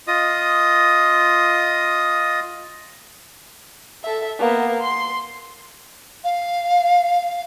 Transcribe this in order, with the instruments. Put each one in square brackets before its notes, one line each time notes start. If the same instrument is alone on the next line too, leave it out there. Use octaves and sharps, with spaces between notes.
[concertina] F4 D#5 D#6
[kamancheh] A4 E5
A#3 B3
C6
[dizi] F5